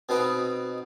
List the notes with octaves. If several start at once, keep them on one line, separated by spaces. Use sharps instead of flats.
B2 C4 D#4 B4